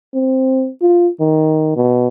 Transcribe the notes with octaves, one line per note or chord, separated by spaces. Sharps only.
C4
F4
D#3
B2